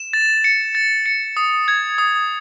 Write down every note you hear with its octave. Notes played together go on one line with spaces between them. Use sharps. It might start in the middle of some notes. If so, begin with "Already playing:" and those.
Already playing: E7
A6
C#7
A6
C#7
D#6
G#6
D#6